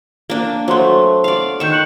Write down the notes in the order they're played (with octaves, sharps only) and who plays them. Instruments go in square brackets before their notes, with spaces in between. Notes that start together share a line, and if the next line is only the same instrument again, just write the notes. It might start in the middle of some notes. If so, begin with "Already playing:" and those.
[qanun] A#3 D4
[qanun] F#3 A3 [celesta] C5 C6
[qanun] D5 F5
[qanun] D#3 C#6 [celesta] G6 E7
[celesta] F#6 C#7 F#7